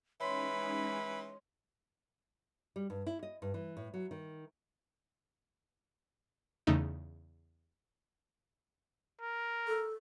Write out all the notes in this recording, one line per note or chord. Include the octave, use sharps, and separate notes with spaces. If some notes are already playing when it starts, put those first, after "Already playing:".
E3 G#3 C#4 D#4 C#5 B5 C6
G3
G2
E4
D#5
G2
E3
A2
F#3
D#3
E2 C#3 A3 D#4
A#4
A4